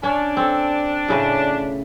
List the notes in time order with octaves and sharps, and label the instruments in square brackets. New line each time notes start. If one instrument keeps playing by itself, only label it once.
[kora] C#4 C#5 [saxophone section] D4
[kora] C4 A4
A2 C#3 B4